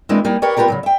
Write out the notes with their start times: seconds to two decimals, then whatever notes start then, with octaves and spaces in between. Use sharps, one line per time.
0.09 E3 G#3 A#3 C4 D4 E4
0.24 G3 A#3 D#4
0.42 G4 A#4 B4 C#5 D5 G5
0.57 B3 F4 G4 A#4 D5
0.68 C#3 E3 F#3
0.83 E5 G5